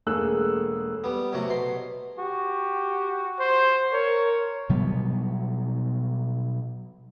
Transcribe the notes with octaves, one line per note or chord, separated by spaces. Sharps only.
E1 A3 A#3 G#4 E6 F#6
G3 B3
F#2 C3 A3 F#4
B2 C6
F#4 G4
C5
A#4 C#5
B2 F#3 G3 B3